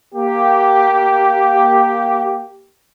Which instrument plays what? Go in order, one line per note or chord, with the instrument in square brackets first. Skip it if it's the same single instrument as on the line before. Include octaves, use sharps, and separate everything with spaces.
[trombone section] A#3 G4